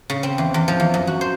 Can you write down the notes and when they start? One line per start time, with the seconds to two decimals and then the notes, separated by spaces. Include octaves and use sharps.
0.10 C#3
0.23 C4
0.38 E2
0.54 E2
0.68 F3
0.80 E2
0.94 F#2
1.07 F#4
1.21 C5